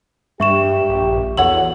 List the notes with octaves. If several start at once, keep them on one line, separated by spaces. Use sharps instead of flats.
G2 G4 E5 C#6 E7
A#1
E2 F#3 A4 C#5 F#5 F#7